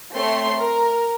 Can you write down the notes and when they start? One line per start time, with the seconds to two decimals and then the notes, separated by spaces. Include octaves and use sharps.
0.14 A3 C4 C#5 C6
0.56 A#4